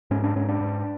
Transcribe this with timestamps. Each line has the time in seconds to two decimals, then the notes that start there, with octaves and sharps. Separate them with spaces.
0.11 G#2 C#4
0.24 D4
0.36 G#2 C#4
0.49 D4
0.61 G#2